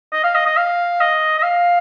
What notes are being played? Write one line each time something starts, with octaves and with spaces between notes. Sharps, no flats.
D#5
F5
D#5
D#5
F5
D#5
D#5
F5